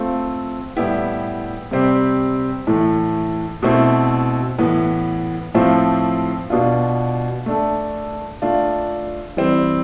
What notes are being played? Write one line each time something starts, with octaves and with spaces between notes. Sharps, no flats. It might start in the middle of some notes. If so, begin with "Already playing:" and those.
Already playing: A3 C4 F4
A2 G3 B3 E4 G4
C3 G3 C4 G4
A2 E3 A3
B2 A3 C4 E4
A2 E3 B3
A2 F3 A3 C4 F4
B2 B3 D4 F4
A3 D4 A4
A3 D4 F4
E3 G3 C4